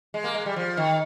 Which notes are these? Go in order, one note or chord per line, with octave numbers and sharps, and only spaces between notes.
G#3
A#3
G#3
G3
F3
D#3